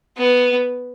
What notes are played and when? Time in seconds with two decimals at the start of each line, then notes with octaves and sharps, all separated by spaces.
0.18 B3